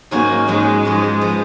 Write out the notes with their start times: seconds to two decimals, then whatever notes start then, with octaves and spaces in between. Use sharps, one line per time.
0.11 G#2 D#3 F#3 A#3 C#4 F#4
0.48 G#2 D#3 F#3 G#3 C#4 F#4
0.85 G#2 F3 B3
1.21 F3 B3